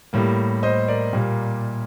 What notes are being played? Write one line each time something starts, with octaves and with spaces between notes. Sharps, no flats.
A2 G3 A#3
C5 D#5
A#4 D5
A#2 G3 A#3